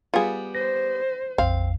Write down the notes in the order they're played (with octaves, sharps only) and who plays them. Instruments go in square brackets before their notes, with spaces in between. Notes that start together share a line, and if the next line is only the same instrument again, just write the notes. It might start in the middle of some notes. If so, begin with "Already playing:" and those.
[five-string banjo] G3 B3 [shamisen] F4 G#4
[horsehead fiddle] C5 [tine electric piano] A#6
[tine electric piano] A#1 F2 [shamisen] C4 [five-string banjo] F5